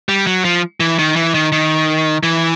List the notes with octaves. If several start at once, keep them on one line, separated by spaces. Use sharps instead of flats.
G3
F#3
F3
E3
D#3
E3
D#3
D#3
E3